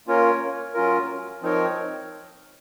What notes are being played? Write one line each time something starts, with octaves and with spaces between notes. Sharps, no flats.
A#3 C#4 F4 A#4 C#5
F#3 C#4 F4 A#4
F3 C4 D#4 A#4 C#5